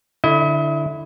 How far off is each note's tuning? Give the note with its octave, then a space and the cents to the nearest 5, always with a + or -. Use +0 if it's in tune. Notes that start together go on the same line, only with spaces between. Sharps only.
D3 +0 E4 +0 D#5 +40